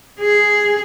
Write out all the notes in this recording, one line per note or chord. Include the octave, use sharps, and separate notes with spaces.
G#4